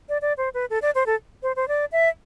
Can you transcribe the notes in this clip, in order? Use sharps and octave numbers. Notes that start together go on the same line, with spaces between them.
D5
D5
C5
B4
A4
D5
C5
A4
C5
C5
D5
E5